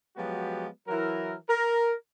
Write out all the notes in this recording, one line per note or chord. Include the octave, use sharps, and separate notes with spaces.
F3 F#3 G#3 B3 F#4 G4
E3 F#3 E4 A#4
A#4